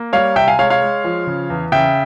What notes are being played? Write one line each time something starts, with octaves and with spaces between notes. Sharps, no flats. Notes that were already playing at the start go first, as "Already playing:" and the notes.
Already playing: A#3
G3 C#5 F5
C3 E5 G5
F5 G#5
G#3 C#5 F5
C#5 F5
G#3
F3
C#3
E2
C#3 E5 G5